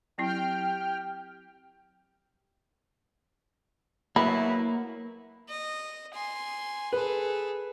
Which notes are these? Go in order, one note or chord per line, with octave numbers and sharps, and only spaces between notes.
F#3 C4 E4 G4 G5 F6
F#3 A#3 B3 E4 B5
D#5
G#5 C6
G#4 A4 B4